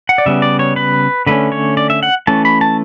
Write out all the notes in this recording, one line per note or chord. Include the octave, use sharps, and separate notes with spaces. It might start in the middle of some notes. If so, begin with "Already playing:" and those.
F#5
D5
C#3 G3 B3 E5
D5
C#5
B4
D3 A3 C#4 B4
C#5
D5
E5
F#5
E3 A3 C#4 A5
B5
A5